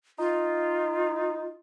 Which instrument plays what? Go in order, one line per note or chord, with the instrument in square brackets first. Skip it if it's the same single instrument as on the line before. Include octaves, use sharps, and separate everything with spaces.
[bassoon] D#4 [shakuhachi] F4